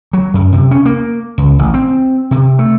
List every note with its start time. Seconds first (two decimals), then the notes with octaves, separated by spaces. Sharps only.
0.13 F#3
0.34 F#2
0.52 C3
0.71 C#4
0.85 A#3
1.38 C#2
1.59 A1
1.74 C4
2.31 C3
2.59 A3